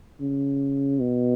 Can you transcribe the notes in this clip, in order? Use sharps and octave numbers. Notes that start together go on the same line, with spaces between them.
C#3
B2